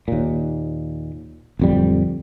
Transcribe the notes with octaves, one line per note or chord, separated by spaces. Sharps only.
D#2 A#2
D1 F2 G3